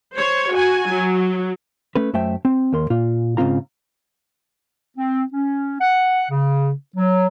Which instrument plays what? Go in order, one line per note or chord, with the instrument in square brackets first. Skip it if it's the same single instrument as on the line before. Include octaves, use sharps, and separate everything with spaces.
[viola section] C5 C#5
F#4 G#5
F#3
[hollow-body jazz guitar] A3 C#4 B4
F#2 A3 C5 E5 G5
C4
D#2 A#4 C6
A#2 F4
G#2 C#3 G#3 C4 F4 A#5
[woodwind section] C4
C#4
F#5
C#3
F#3